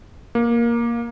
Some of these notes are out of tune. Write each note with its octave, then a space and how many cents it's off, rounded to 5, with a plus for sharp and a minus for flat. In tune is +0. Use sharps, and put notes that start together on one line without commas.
A#3 +10